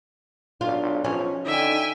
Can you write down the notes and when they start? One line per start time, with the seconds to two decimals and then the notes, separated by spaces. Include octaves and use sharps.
0.61 B1 D4 F4
1.04 F3 C#4
1.46 D3 D#4 E5 G5 G#5